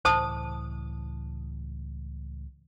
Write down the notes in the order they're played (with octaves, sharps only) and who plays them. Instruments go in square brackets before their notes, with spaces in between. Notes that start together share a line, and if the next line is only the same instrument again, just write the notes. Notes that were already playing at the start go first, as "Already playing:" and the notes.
[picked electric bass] C#2 A2 E3 [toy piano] C5 A5 D#6